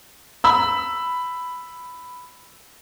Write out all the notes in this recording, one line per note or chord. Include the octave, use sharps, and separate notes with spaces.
B5 E6